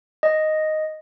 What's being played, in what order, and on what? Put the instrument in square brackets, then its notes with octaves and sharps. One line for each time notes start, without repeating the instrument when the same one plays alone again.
[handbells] D#5